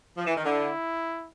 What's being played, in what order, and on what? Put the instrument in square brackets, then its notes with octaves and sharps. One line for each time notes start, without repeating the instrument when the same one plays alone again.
[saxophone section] F3
E3
D#3
[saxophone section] D3 [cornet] E4